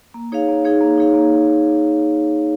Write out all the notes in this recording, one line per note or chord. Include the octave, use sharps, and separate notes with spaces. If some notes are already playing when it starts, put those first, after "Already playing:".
A#3
D#4 G#4 C#5 F5
A#3
D#4 G#4 C#5 F5
A#3
D#4 G#4 C#5 F5
A#3